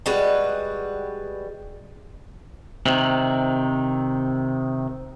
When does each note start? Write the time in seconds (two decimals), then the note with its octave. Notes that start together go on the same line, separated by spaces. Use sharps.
0.06 G3 G#3 F#4 B4
2.86 C3 D#3